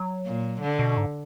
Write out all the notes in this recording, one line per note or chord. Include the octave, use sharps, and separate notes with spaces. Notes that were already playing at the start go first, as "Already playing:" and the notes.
Already playing: F#3
A#2
D3
B2
G#2